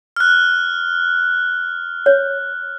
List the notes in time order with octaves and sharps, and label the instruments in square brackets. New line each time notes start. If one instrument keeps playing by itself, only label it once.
[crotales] F6 F#6
[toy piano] C#5